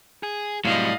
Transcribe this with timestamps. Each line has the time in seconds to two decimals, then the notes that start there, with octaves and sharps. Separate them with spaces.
0.23 G#4
0.65 A2 C3 F#3 G3 D#5 F5